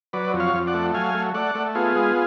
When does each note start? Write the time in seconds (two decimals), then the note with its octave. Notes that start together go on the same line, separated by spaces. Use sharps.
0.13 F#3 B4 D5
0.33 F2
0.40 C#5 F5
0.54 F2
0.67 D5 F#5
0.74 A3
0.94 F#3 F5 G#5
1.14 A3
1.34 A3 D5 F#5
1.55 A3
1.75 B3 F4 G#4
1.95 G#3